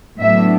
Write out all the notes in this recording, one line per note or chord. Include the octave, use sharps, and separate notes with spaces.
A2 F#3 B3 D4 E5